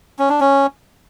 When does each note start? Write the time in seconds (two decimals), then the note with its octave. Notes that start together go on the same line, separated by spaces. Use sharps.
0.19 C#4
0.29 D4
0.40 C#4